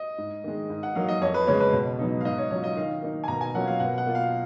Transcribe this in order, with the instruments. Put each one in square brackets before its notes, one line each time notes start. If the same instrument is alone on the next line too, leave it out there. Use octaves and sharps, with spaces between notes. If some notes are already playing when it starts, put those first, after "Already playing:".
Already playing: [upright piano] D#5
G#2
D#3 G#3
G#2
F#5
F#3 A#3 D#4 F5
D#5
F2 C#5
B4
C#3 G#3 C#4 C#5
B4
B2
F#3 B3 D#4
F5
G#2 D#5
C#5
F#3 C#4 F4 C#5
D#5
D#3 F5
A#3 D#4
G#5
B2 A#5
G#5
F#3 A#3 C#4 F4 F#5
F5
B2 F#5
F#5
A#3 F4
F5